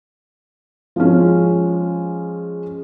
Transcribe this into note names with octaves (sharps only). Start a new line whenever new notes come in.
F3 G#3 C#4